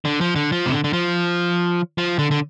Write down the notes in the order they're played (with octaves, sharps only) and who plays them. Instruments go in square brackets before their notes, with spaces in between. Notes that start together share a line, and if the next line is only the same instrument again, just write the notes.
[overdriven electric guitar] D3
F3
D3
F3
C3
D3
D3
F3
F3
D3
D3